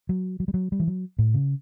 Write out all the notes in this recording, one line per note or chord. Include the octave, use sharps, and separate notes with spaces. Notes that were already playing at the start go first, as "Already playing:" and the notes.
F#3
F#3
G3
F#3
G3
E3
F#3
A2
C#3